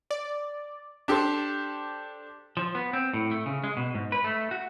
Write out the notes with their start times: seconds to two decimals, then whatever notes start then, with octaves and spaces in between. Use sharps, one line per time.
0.11 D5
1.08 D4 G4 A4 C5
2.57 F3
2.75 B3
2.93 C4
3.13 A2
3.31 A3
3.46 C#3
3.64 G#3
3.77 B2
3.95 G#2
4.12 B4
4.24 A3
4.51 F#4